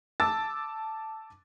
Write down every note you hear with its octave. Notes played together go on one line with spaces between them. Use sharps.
A5 D6 E6 A6